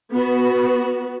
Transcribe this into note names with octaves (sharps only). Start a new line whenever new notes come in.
B3 F#4